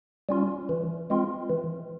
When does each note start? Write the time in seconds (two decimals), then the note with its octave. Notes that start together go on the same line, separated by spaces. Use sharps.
0.29 G3 C#4 F4
0.69 E3
1.10 G#3 C4 F4
1.50 E3